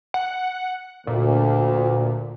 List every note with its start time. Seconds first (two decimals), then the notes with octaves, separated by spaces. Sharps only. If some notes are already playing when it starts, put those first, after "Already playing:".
0.14 F#5
1.07 D2 A#2